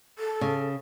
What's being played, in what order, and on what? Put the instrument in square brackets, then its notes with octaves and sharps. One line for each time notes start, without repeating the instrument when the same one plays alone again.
[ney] A4
[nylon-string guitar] C#3